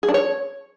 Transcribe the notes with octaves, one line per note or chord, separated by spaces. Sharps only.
G#4
D4
C#5